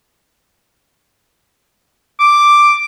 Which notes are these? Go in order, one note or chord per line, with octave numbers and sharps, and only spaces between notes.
D6